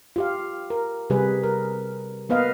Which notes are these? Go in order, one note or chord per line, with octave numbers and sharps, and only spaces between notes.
F4 G4 F5
A#4
C3 G3 G#4 B4
A#4
A#3 B3 B4 D#5 F5